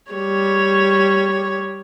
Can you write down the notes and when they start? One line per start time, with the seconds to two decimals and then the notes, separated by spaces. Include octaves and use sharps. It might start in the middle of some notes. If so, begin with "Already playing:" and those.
0.11 G3 C#5